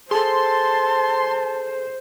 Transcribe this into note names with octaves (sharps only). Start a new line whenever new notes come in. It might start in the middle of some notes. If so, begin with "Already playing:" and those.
G#4 A4 C5 A5 C6